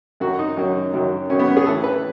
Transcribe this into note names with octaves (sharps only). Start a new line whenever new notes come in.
F#2 D#3 F#3 F#4
D#4
F#2 D#3 F#3
F#2 D#3 F#3
F#2 D#3 F#3 C#4
B3
C#4
G#4
A2 E3 A4
B4